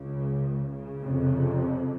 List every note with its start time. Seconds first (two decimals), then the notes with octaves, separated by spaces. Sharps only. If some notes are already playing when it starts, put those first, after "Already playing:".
Already playing: C#2 C#3
0.71 C#3
1.02 F2 C3